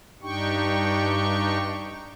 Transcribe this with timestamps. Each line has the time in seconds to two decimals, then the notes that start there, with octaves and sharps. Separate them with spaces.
0.22 G2 D4 D#4 G4 G5 C#6